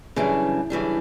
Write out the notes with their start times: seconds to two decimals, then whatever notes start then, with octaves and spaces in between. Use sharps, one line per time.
0.16 F#2 C#3 E3 G3 D4
0.70 F#2 C#3 E3 G3 D4